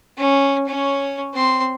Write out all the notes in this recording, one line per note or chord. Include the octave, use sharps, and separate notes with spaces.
C#4
C#4 C#5
C4 C6